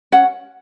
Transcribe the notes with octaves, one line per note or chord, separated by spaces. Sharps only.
C#4 F#5